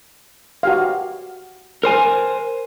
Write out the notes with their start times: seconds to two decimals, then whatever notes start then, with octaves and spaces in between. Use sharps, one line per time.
0.63 F#4 G4 F5
1.83 A#4 C5 G#5